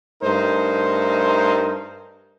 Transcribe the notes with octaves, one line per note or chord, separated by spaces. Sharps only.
G2 A3 D#4 A#4 C5